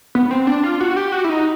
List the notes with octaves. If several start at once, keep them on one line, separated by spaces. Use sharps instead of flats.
B3
C4
D4
F4
F#4
G4
F#4
E4
D#4